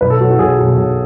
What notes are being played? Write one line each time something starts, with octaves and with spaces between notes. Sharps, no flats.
B1 B4
A4
B2 F#3 F#4
F#4
B1 G#4
B2 F#3
B1